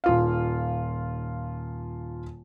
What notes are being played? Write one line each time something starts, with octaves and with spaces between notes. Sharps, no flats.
D#1 F4 F5